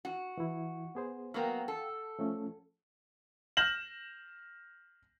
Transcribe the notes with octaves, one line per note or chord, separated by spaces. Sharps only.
F#4
E3 E4
B3 G#4 C5
F#3 A#3 B3 F5 G5
A4
F3 A3 C#4
F6 G6 A#6 E7 F#7